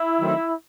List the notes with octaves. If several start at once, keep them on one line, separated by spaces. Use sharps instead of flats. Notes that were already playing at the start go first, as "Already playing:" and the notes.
Already playing: E4
D#3 F#3 A3 C4 D#4